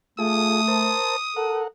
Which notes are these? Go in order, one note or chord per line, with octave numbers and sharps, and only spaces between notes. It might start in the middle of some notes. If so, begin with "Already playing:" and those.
A3 F4 G#4 A4 D#6
A#4 C5 A5
A4 A#4 F#5